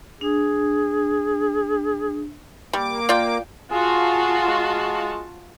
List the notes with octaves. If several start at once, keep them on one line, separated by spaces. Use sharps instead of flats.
D4 G#4
G3 A#3 D6
F4 D5 G5
F4 F#4 G#4 A5
G#3